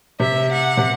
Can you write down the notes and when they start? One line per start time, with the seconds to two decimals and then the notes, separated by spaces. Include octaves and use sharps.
0.20 C3 E5
0.52 F#5
0.77 C3